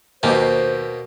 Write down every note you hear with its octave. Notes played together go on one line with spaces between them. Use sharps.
D#2 B2 A#3 C5